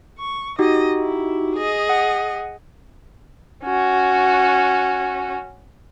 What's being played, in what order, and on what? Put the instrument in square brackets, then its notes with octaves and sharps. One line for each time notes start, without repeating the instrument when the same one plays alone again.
[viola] C#6
[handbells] D#4 F#4 G4 [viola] D#5
[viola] E4
G#4 D#5
[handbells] F#5
[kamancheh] C#4 F#4